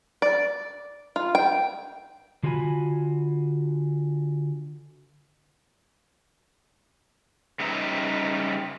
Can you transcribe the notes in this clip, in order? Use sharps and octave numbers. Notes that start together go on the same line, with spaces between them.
D5
F4
G5
D3 F4 F#4 C5 G#5 B5
C#3 G3 D#4 B4 E5 A#5